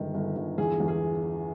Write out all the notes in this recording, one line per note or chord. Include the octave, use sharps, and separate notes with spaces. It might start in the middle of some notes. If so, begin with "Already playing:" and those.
Already playing: G1 D#3 G#3
G1
G1
E2 G#4
E2
G#4